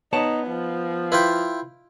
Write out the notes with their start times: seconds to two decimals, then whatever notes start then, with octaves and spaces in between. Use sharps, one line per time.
0.13 B3 D#4 C#5 A5
0.48 F3
1.12 E4 F4 B4 G5